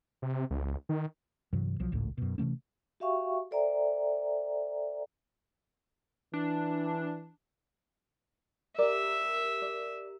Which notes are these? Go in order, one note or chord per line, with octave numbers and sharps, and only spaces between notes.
C3
C#2
D#3
G2 C3 E3 F#3
B1 F3 F#3
G#1 C#2 A2
F#2 B2
C3 E3 A3 C#4
F#4 G4 E5 F5 G5 C#6
A4 C5 D5 E5 G5 A#5
E3 D4
G4 A#4 D5 E5
D5